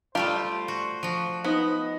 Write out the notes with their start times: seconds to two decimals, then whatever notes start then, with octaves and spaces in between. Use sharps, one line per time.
0.15 G3 A3 F4 G4 C5 A5
0.68 F#4
1.03 F3 F#4
1.44 B3 D#4 C5 D#5